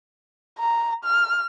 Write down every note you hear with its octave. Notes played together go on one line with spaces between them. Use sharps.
A#5
F6